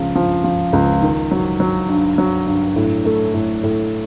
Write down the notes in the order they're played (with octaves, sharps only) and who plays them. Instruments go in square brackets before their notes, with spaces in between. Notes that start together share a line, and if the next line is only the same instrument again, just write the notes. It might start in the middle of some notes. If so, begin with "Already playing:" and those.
Already playing: [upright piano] C#2 C#3 F3
F3
F3
C#2
D#3
F#3
F#3
G2
F#3
G2
A2
A3
A2
A2